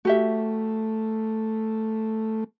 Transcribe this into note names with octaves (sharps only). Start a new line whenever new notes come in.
A3 F#4 G4 E5